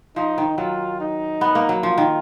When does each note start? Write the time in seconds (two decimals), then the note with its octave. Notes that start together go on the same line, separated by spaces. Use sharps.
0.16 F3 D#4
0.38 D#3
0.58 F#3 F4
1.00 D#4
1.41 B3
1.55 A#3
1.69 F#3
1.83 F3 F4
1.98 D#3